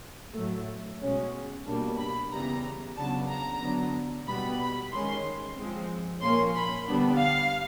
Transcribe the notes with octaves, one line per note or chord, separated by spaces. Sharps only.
A2 F#3 A3
B2 G#3 C#4
B2 G3 A#3 D4
B5
C#3 E3 G3 B3 A#5
C#3 F#3 B3 D4 A5
A#5
D3 F#3 B3 D4
B2 G3 B3 B5
B5
D#3 G#3 C#4 C6
F3 G#3 C4
A#2 F3 A#3 C#4 C6
B5
D3 G3 B3 D4
F5